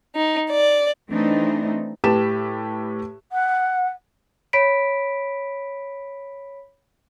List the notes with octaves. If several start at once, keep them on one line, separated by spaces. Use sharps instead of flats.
D#4
D5
E3 A3 C4 D4 D#4
A2 G4 B4 A5 E7
F#5
C#5 B5 B6 D7